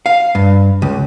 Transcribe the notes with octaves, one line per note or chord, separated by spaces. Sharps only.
F5
G2
C#2